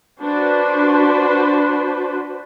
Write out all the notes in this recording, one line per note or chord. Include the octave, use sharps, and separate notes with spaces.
D4 F#4 B4 C5